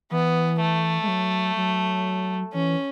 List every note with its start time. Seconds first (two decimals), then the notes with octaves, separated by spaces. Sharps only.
0.11 E3 B3
0.60 A3
1.03 G#3
1.08 F#3
1.57 F#3
2.53 E3 C#4